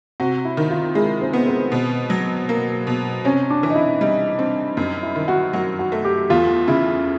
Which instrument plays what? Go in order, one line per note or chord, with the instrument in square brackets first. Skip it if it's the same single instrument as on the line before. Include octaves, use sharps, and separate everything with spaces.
[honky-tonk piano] C3 [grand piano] F#4
[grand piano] E4
[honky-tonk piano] D#3
[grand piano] F4
[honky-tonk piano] G#3 [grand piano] E4
[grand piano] C4
[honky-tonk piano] B3
[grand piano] C4
[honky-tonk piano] B2
F#3
A#3
B2
[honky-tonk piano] C3 [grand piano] C#4
[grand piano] D4
[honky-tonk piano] E3
[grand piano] D#4
E4
[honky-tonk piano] G3 [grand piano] D#4
[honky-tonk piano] C4 [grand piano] D4
[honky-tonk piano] F#2 [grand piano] D#4
[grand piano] E4
[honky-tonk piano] D#3
[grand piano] F#4
[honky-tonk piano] F#3 [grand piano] F#4
[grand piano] F#4
[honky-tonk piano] A3
[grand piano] G4
[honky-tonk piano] E2 [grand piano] F4
[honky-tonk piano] C#3 [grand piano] E4